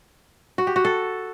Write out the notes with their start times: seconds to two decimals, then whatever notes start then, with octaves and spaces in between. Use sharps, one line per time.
0.58 F#4
0.67 G4
0.76 F#4
0.85 A4